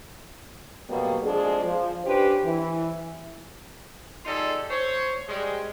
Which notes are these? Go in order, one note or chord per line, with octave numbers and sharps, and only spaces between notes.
F2 B2 F#3 G3 A#3 B3
F2 F3 G#3 D4 G#4
F3
C#4 D4 G4 B4 C5
E3
G3 D#4 F4 G#4 A4
C5 C#5
G3 G#3